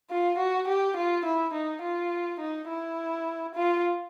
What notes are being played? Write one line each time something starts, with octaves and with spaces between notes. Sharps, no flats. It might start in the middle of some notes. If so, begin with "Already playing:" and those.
F4
F#4
G4
F4
E4
D#4
F4
D#4
E4
F4